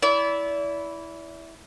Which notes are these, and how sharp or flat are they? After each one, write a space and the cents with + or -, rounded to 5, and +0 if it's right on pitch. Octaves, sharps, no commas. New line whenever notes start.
E4 -5 D5 -35